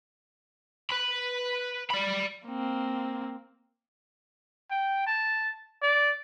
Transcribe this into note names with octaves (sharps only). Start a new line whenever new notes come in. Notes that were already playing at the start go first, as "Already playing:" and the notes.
B4 B5
D5 B5
A#3 C4
G5
A5
D5